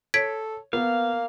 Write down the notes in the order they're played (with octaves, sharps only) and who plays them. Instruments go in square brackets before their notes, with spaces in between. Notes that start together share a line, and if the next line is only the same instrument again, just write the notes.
[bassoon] A4 [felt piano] C#5 [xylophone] G#6 B6 D7
[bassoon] A#3 [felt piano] B3 [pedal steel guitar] F5